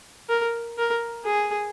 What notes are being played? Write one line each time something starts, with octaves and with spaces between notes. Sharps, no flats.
A#4
A#4
G#4